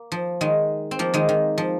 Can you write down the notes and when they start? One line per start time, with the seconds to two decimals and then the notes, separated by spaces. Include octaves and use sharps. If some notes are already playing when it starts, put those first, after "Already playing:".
Already playing: A#3
0.12 F3
0.41 D#3 G#3
0.91 C4
0.99 F3 A#3
1.14 D#3 G#3
1.29 D#3
1.58 F3